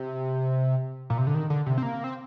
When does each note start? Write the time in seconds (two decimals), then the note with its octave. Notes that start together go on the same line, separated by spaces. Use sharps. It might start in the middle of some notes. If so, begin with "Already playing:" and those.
Already playing: C3
1.10 A#2
1.18 C3
1.27 D3
1.34 D#3
1.50 D3
1.66 C3
1.78 C4
1.83 A#3
2.04 C4